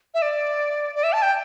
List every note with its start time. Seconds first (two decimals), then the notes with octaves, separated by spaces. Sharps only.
0.14 E5
0.22 D5
0.95 D5
1.03 E5
1.13 A5
1.22 G5